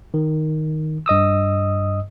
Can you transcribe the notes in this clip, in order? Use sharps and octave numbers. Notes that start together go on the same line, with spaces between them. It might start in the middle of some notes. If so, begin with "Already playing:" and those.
D#3
G2 D#5 D#6 E6